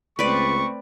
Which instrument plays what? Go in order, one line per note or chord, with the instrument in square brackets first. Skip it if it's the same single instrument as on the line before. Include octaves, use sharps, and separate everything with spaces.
[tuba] C#2 [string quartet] A3 C4 [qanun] B4 D5 [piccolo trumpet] C#6